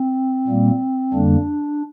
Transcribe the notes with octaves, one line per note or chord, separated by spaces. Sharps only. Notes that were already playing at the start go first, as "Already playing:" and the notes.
Already playing: C4
A#2 G3 A#3
F2 D3 G3 A#3 D4